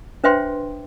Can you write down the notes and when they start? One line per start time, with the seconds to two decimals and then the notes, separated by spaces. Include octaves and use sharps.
0.24 D4 B4 C5 E5 G5 C6